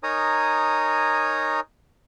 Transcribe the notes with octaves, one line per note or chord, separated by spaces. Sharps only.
D#4 A#4 C#5 G#5 A#5 D#6